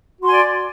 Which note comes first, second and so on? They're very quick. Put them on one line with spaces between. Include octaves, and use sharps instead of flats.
F#4 C6 G#5 D5